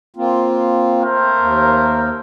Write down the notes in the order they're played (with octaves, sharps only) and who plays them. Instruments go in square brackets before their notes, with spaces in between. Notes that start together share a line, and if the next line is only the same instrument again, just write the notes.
[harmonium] A#3 C4 F4
[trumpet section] A3 A#4 C5
[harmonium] D#2 A#3